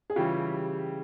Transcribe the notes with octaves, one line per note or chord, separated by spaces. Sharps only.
G#4
C#3 E3 G3 F4 G4